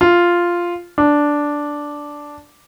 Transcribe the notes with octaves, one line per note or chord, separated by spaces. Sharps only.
F4
D4